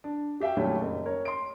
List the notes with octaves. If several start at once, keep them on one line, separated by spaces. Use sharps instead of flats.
D4
F#4 G4 E5 F5 G5
A#2 D#3 F#3 G3 A3 C#4
F#1
A#4 C#5
C6 D7